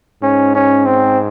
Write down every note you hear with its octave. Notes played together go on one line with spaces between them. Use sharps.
G#2 C#4
C#4
C4